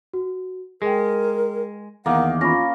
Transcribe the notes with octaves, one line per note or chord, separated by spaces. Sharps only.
F#4
G#3 G#4 A#4 G5
E2 D#3 A#3 F#5 D#6
C#4 F4 B5 A#6